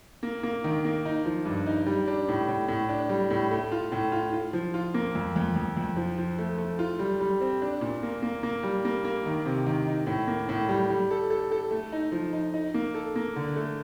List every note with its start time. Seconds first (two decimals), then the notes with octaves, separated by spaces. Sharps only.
0.23 A#3
0.43 A#3
0.64 D#3
0.85 A#3
1.05 D#4
1.25 F3
1.45 G2
1.66 D#4
1.86 G3
2.08 D4
2.29 A2
2.48 A2
2.68 A2
2.89 D4
3.09 G3
3.30 A2
3.51 A3
3.72 F4
3.92 A2
4.12 F4
4.33 F4
4.53 F3
4.74 F4
4.94 A#3
5.15 F2
5.36 F2
5.56 F2
5.77 F2
5.97 F3
6.18 F3
6.38 A3
6.58 A3
6.79 F4
6.99 G3
7.20 G3
7.41 C4
7.62 D4
7.81 A#2
8.03 A#3
8.22 A#3
8.43 A#3
8.63 G3
8.85 A#3
9.05 A#3
9.26 D#3
9.45 C3
9.66 D#3
9.87 D#4
10.07 A2
10.27 A#3
10.49 A2
10.69 G3
10.90 G3
11.10 A4
11.30 A4
11.52 A4
11.71 A3
11.92 D#4
12.12 F3
12.33 D#4
12.54 D#4
12.74 A#3
12.94 A4
13.16 A#3
13.36 D3
13.56 A3